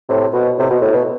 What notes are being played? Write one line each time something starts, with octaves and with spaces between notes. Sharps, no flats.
A2 C3
B2
A2 C3
B2
A2
B2